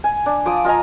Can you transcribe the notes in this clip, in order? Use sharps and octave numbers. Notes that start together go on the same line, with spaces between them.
G#5
D4
F3 D6 D#6
F4 D#5 G#5 A#5